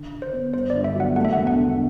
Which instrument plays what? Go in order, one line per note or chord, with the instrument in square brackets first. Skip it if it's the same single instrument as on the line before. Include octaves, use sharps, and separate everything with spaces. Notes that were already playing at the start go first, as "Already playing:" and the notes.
Already playing: [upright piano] D3
D3
[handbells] C5
[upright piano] B3
[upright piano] G1 [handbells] C5
[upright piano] G1 [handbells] D5
[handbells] E5
[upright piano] F#3 [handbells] F#5
[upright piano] A3 [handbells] F#5
[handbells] E5
[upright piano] E1 [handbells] F#5
[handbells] F#5
[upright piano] D3